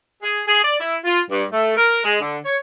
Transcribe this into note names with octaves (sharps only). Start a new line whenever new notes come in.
G#4
G#4
D5
E4
F4
G2
A3
A#4
G#3
D3
C#5